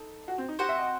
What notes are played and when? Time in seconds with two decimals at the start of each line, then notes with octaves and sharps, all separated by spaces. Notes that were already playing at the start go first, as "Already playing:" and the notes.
Already playing: D#4 A4
0.28 F#4
0.38 C4
0.48 D#4
0.59 C4 F#4 G4 C5 F#5
0.69 E5
0.78 D#5